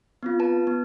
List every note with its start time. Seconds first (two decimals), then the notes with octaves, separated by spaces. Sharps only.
0.23 B3 C4 F4
0.40 B4 A5
0.67 B3